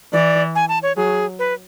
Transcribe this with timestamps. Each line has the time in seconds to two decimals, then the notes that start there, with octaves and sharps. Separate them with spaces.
0.13 E3 D5
0.55 G#5
0.69 A5
0.83 C#5
0.96 F#3 G#4
1.39 B4